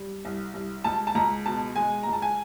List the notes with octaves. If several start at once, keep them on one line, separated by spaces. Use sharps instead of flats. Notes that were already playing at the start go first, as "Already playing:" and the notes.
Already playing: G3
C2
C2
C#2 A5
A5
C#2 A#5
B2 A5
G#3 G#5
C#2 A#5
A5
G#5